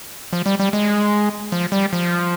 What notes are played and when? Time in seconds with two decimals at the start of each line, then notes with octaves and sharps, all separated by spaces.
0.33 F3
0.46 G3
0.60 G3
0.73 G#3
1.52 F3
1.72 G3
1.93 F3